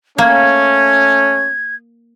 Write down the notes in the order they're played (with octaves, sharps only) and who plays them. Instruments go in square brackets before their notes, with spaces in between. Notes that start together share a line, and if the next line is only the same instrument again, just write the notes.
[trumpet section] A3 C#4 [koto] A#3 [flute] G#6